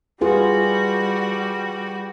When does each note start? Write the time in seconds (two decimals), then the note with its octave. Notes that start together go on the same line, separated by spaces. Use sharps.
0.21 G3 F4 F#4 G#4 B4